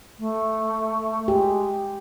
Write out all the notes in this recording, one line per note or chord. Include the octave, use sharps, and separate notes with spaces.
A3
G#3 G4